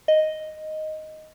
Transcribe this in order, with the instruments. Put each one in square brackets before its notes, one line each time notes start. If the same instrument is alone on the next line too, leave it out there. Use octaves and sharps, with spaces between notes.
[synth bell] D#5